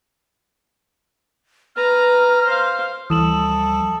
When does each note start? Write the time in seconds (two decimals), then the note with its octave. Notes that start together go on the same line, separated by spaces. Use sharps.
1.76 B4 A#5 F6
2.45 C5 F5
3.10 D2 E3 F3 G3 A4 D#6 E7 F#7